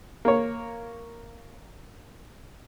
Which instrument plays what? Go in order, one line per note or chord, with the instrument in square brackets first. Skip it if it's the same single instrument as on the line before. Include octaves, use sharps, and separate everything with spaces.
[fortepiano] A#3 C#5